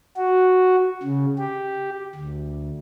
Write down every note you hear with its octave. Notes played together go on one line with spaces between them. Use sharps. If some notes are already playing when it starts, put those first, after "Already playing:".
F#4
C#3
G4
D2